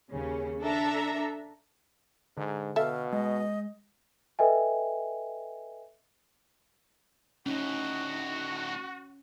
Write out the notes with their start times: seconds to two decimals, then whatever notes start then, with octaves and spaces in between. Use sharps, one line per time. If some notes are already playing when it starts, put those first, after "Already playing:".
0.12 D#2 C#3 C#4
0.62 D4 A4 E5 A#5
2.37 G#2 D3
2.76 B2 A4 E5 F5
3.13 G#3 D#5
4.39 A4 B4 D#5 E5 G5 G#5
7.46 D2 A2 C#4 D#4 F#4